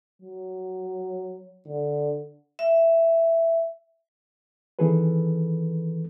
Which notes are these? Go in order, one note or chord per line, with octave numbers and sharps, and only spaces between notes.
F#3
D3
E5
D#3 E3 C4 G#4 A4 B4